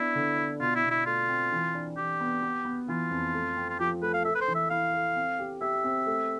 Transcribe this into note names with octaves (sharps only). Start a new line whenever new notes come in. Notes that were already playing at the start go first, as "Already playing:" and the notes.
Already playing: B3 D4 E4
D3
D4
B2 F4
E4
B2
E4
A3 F4
C4
E3
D4
E3 G4
B3
B3
B3
E3 F4
F2
A3
C4
F4
F3 G4
A3 B4
F5
A4 E5
B4
C5
E3
E5
E4 F5
A4
C4
G4
G4 E5
C4
A3